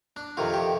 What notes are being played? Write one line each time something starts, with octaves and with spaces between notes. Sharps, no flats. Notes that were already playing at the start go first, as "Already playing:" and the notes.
D4
F2 C3 D#3 F4
G4